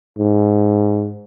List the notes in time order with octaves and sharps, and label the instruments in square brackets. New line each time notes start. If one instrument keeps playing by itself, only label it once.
[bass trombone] G#2